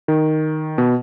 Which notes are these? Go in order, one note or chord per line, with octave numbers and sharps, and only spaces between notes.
D#3
B2